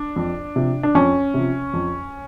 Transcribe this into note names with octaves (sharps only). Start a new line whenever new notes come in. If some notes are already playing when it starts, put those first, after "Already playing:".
Already playing: D4
F2
C3 F3
D4
F2 C#4
C3 F3
F2